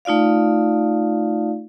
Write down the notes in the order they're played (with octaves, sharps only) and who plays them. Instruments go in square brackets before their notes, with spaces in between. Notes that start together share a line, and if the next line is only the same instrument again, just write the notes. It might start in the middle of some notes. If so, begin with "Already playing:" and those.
[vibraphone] A3 D#4 F4 D5 F5